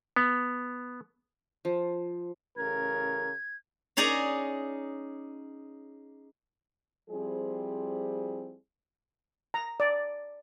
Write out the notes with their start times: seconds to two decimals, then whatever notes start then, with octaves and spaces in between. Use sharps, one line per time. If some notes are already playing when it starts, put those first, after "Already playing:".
0.16 B3
1.65 F3
2.57 A1 C#3 A#4 G#6
3.97 C#4 D#4 G#4 D5 G#5 A#5
7.10 F3 G3 C4 E4 G#4
9.54 A#5
9.80 D5